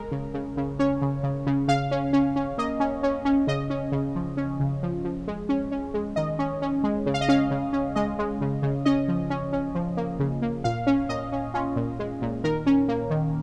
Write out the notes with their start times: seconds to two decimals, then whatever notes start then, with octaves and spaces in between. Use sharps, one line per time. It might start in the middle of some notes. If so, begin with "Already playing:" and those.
Already playing: G#3 A#4
0.12 C#3
0.34 C#3
0.57 C#3
0.79 C#4 C#5
1.02 C#3
1.23 C#3
1.47 C#3
1.68 C#3 F5
1.91 C#4
2.13 C#4
2.36 C#4
2.58 A#3 D#5
2.80 C#4
3.03 C#4
3.25 C#4
3.47 C#3 D#5
3.70 C#4
3.92 C#3
4.15 F3
4.37 C#4
4.60 C#3
4.83 F3
5.04 F3
5.28 G#3
5.49 C#4
5.72 C#4
5.94 G#3
6.16 D#3 D#5
6.39 C#4
6.62 C#4
6.84 G#3
7.06 C#3
7.14 F5
7.21 D#5
7.28 C#4 F5
7.51 C#3
7.73 C#4
7.96 G#3 D#5
8.19 G#3
8.41 C#3
8.62 C#3
8.85 C#4 D#5
9.08 F3
9.30 C#4
9.53 C#4
9.75 F3
9.97 A#3
10.20 C#3
10.42 A#3
10.64 A#2 F5
10.87 C#4
11.09 A#2 D#5
11.32 C#4
11.54 C#4 F4
11.76 A#2
11.99 G#3
12.22 A#2
12.44 D#3 A#4
12.66 C#4
12.88 A#3
13.10 D#3